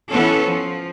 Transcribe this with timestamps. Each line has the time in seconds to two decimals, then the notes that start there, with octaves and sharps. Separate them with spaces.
0.10 E3 B3 C#4 A4
0.45 F3